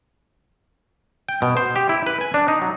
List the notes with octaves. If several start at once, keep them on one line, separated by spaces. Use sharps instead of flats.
G5
B2
C5
G4
E4
B4
G#5
D4
D#4
F#3